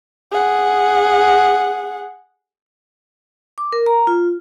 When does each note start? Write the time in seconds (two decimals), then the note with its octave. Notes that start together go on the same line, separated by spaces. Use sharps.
0.32 G#4 F#5
3.58 D6
3.73 A#4
3.86 A#5
4.07 F4